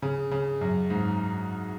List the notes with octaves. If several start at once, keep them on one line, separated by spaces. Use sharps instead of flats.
C#3
C#3
F#2
G#2